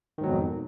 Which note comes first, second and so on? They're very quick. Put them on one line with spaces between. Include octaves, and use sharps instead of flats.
D#3 G#2 F#3 B2 F2